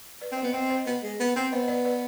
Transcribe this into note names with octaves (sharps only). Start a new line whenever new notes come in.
B4 D5
C4
C5 D#5
B3
C4 C5 D#5
C5 D#5
B3
G#3
B3
C4
B3 C5 D#5
B4 D5
B4 D5